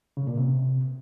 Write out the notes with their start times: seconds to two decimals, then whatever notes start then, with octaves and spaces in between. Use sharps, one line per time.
0.17 C#3
0.27 A#2
0.37 C3